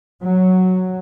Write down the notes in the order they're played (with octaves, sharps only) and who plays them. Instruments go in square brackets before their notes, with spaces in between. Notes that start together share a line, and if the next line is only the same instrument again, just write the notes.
[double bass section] F#3